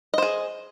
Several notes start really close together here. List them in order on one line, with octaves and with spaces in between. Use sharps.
D#5 C5 G#4